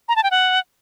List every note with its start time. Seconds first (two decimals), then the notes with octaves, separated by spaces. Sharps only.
0.09 A#5
0.16 A5
0.23 G5
0.31 F#5